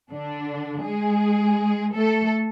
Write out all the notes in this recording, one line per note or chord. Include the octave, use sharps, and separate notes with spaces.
D3 D4
G#3 G#4
A3 A4